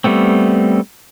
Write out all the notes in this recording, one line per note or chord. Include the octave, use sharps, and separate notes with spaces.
G3 A3 B3 C4